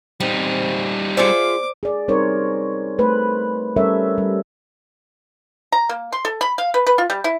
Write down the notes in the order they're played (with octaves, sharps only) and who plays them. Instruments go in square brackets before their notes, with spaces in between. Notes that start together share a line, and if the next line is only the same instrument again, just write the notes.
[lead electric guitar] G3 D#4 [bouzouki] C4
[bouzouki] F4 G#4 E5 [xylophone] C5 D5 C#7 [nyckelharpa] D6
[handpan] G#4 D5
G3 C4 D#4 A#4 C5 C#5
A3 B4 C5
G3 C#4 A4 A#4 C#5 E5
G3
[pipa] A#5
A#3
C6
A4
B5
F5
B4
B4
F4
G3
E4